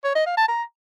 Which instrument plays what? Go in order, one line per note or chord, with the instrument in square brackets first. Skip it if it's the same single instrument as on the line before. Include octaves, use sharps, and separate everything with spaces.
[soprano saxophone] C#5
D#5
F5
A5
A#5